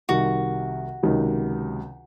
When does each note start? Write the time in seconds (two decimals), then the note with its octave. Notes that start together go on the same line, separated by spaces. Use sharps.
0.09 C2 C3 D#3 F#4
1.03 C#2 C3 D#3 F#3